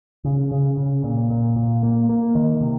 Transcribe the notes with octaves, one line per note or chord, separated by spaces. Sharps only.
C#3
C#3
C#3
A#2
A#2
A#2
A#3
A#3
D#3
C3